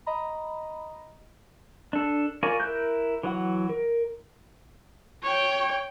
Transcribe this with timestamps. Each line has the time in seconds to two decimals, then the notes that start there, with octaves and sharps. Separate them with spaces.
0.06 D#5 A#5 B5
1.93 D4 A4
2.43 F4 A#4 C#5 D5 G#5
2.60 E4 A#4 A#5 F#6 G6
3.23 E3 F#3 F#5
3.69 A#4
5.24 C#5 G5